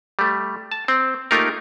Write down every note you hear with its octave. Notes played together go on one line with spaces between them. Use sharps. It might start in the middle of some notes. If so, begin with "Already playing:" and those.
G3 A3
A5
C4
A3 A#3 D#4 F4 G4 A#4